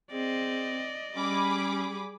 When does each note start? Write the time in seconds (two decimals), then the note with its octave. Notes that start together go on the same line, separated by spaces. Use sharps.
0.12 C4 G#4 D5 D#5
1.16 G3 C#4 G#4 B5 D6